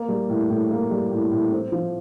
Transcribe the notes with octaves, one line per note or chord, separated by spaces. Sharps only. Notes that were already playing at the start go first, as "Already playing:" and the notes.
Already playing: A#3
G3
A2
A2
A#3
G3
A2
A2
C4
F3